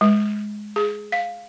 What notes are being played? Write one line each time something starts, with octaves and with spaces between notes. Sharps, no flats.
G#3
G#4
F5